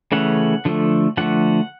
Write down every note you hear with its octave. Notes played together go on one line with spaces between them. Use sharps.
C#3 E3 A3 C#4 F#5
D3 F3 A3
D3 F3 A3 F#5